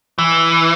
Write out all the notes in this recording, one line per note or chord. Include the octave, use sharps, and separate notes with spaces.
E3